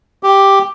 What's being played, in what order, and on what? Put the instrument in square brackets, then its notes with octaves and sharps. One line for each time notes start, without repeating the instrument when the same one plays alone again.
[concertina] G4